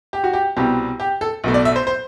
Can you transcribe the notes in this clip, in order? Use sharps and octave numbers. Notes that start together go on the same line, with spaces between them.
G4
F#4
G4
C2 B2 G3 C4 G4
G4
A4
B1 B2 A3
D5
E5
C5
C5